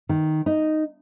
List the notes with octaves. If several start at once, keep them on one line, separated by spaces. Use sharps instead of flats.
D#3
D#4